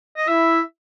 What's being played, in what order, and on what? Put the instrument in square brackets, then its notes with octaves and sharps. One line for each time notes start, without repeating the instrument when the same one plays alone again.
[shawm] D#5
[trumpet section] E4 [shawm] E5